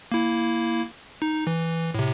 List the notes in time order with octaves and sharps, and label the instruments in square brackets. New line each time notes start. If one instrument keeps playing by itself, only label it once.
[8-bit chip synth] A#3 E4
D#4
E3
A2 C3